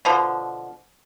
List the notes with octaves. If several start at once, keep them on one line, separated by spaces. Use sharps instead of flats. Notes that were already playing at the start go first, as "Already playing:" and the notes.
B2 D3 F3